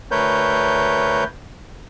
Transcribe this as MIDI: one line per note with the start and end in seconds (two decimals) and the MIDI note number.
0.11 1.24 38
0.11 1.24 57
0.11 1.24 70
0.11 1.24 71
0.11 1.24 73
0.11 1.24 91